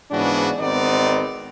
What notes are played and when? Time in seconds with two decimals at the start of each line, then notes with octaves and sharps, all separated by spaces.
0.11 G#2 C#3 E3 B3 D4 F#4
0.59 G#1 D#3 B3 C4 D#4 D5